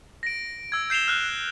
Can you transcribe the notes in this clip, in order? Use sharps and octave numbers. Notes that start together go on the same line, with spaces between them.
A#6 D7
E6 G#6
G6 C7 E7 F7 G7
F6 F#6